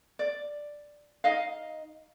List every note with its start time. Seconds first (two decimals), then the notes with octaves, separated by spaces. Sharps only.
0.19 D5
1.24 D#4 D#5 F5